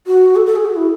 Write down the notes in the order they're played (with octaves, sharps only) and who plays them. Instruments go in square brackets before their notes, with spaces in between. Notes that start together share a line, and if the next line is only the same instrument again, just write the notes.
[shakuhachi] F#4
A4
A4
G#4
F#4
E4